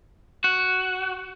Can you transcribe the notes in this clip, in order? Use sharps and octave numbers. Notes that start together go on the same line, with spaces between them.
F#4